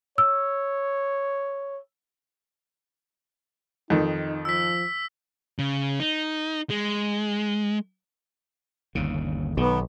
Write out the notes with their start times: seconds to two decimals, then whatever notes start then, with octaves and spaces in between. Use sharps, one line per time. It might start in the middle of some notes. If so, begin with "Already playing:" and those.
0.18 C#5 E6
3.90 F2 D#3 D#4
4.45 F3 E6 B6
5.59 C#3
6.00 D#4
6.70 G#3
8.95 G1 D#2 C#3
9.57 B1 D#3 B3